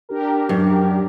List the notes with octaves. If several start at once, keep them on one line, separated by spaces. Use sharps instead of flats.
D4 G4 A#4
F#2